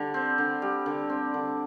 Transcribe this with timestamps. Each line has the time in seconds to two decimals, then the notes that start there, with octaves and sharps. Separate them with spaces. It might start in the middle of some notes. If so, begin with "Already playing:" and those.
Already playing: D3 G3
0.14 C4
0.38 D3
0.62 G3
0.86 D3
1.09 C4
1.34 D3